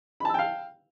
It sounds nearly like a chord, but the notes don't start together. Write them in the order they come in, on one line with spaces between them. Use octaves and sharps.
B5 A5 E6 G5 F5